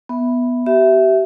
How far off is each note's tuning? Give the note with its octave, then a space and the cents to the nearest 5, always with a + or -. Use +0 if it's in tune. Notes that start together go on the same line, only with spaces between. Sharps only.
B3 +0 E5 +0
G4 -30 E5 +0